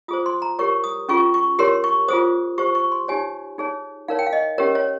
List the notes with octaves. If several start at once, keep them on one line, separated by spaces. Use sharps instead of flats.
F4 G#4 C5 D#6
C6
A#5
G4 A#4 C#5 C#6
D#6
C#4 F4 G#4 C#6
C#6
G4 A#4 C#5 C6
C#6
F4 G#4 C5 D#6
G4 C5 C#6
C#6
C6
D#4 G4 C#5 G#5
D#4 G#4 C#5
D#4 A#4 C#5 F5
G5
F5
D#5
C#4 G4 A#4 C#5
C#5